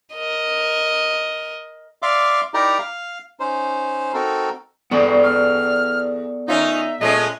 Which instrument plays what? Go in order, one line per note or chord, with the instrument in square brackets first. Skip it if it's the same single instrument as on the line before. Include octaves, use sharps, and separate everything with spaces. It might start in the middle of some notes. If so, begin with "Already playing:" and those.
[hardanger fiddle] A#4 D#5
[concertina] D5 E5 F5 C6 D6
D#4 E4 G4 A#4 D5 A#5
F5
C#4 D#4 C5
C4 D#4 F#4 A4 A#4
[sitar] E2 [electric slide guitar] B3 A4 D5
[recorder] F6
[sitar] D#3 C#4 F4 [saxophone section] D#4 [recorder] E5
[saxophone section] A#2 D#5 [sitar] G#3 A3 C#4